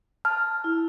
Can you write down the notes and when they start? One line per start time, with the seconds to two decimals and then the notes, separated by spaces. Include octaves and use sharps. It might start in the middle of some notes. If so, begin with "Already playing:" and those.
0.25 A5 F6
0.64 E4